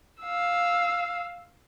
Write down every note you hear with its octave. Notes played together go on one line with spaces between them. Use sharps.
F5 E6